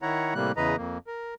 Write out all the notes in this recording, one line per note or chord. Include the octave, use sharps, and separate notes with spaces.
D#3 E4 C#5 F#5 A#5
A2 C3 G3 A#3 F#6
E2 C#3 E3 B4 D#5 A#5
F2 A#3
A#4